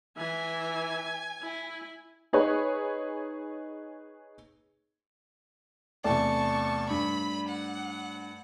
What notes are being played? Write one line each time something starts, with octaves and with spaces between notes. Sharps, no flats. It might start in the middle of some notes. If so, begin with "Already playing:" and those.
E3 E5 G#5
E4
D#4 G#4 B4 C#5
E2 C3 A3 D5 A5 C#6
G2 B5
F#5